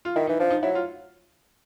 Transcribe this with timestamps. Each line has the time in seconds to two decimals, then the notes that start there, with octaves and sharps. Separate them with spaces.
0.05 F4
0.16 D#3 E4
0.27 E3 D#4
0.39 F3 D4
0.50 D#4
0.63 F#3 E4
0.75 F4